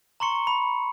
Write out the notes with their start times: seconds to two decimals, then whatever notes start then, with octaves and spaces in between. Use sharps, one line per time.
0.20 A#5 C6 C#6 C#7
0.47 B5